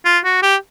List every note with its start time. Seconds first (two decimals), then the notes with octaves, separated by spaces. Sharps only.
0.05 F4
0.25 F#4
0.42 G4